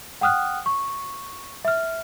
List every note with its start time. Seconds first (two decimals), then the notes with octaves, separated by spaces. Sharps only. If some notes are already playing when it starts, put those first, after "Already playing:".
0.21 F#5 G5 D#6 F6 F#6
0.66 C#6
1.65 E5 F6